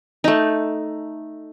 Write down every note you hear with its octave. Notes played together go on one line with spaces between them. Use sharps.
A3 D#4